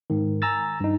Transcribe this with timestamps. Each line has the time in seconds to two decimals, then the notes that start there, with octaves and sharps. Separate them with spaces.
0.10 G#2 D#3
0.42 G#5 A#5 E6 A6
0.80 G2 D#4